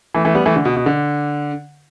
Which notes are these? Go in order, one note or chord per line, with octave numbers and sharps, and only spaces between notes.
E3 A3
E3 A3
G3 B3
E3 A3
D3
B2
B2
D3